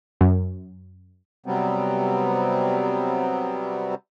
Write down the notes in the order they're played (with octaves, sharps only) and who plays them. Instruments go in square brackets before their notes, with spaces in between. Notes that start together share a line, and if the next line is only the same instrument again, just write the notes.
[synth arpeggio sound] F#2
[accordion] C3 F#3 G3 B3 C4